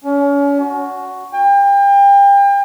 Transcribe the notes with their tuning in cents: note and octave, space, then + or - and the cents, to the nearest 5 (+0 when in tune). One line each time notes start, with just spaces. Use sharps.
C#4 +35
F#4 +0
G5 +35